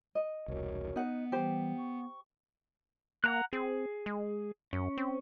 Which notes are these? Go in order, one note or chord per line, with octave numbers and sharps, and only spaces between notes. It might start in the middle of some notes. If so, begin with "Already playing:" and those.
D#5
E1 C2 F#4 A#4 C#5
B3 D#4 F#5
E3 G3 G4 C5
C#6
A#3 F#5 A#5 F#6
C4 G#4
G#3
F#2 C#4
C4